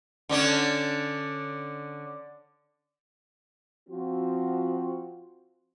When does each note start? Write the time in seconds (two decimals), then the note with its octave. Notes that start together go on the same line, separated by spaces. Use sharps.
0.29 D3 C#4 D4
3.89 F3 C4 F4 F#4